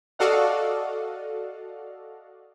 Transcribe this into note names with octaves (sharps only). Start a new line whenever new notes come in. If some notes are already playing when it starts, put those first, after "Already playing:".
F#4 A4 D5 D#5 F5 F#5